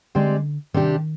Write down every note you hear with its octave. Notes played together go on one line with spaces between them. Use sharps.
D3 G#3 C4 G4 D5
C3 D#3 G3 D4 G4